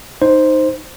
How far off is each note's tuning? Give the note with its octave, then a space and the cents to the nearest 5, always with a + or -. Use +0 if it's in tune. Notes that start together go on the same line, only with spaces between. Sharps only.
D#4 +0 C5 +0